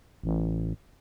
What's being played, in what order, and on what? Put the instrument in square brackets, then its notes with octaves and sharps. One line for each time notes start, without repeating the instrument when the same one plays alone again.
[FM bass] A1